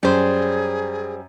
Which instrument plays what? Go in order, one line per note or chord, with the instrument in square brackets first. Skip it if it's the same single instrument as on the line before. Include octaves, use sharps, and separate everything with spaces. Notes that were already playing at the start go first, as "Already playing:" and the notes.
[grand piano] F#2 [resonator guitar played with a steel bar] G3 C5 [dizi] G#4